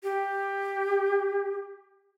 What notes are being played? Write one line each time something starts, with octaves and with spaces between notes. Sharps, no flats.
G4